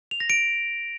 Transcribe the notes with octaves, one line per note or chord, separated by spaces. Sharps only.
F7
A#6
D7